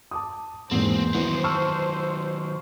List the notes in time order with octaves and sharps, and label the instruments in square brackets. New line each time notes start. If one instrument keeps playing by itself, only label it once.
[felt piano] A5 D6 D#6
[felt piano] E2 A#3 [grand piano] G#2 B2 [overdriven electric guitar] C4 [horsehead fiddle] C5
[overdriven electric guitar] D#3 F#3 [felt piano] E3 [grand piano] B3
[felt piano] A5 C#6 F6 [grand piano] E6